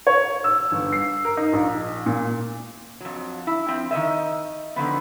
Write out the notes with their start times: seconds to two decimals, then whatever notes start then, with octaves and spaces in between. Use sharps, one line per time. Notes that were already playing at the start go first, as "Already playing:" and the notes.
0.07 C#5
0.44 E6
0.72 G1
0.92 C7
1.25 A#4
1.37 D#4
1.53 A#1
2.06 A#2
3.01 F2 F#3
3.47 E4
3.68 F3 C4
3.91 D#3 F3 D#5 E5
4.76 D3 D#3 F3 B3